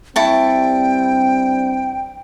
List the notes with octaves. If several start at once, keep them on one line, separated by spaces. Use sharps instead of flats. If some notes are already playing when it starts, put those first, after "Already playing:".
G2 G3 C4 E4 G5 A5 C#6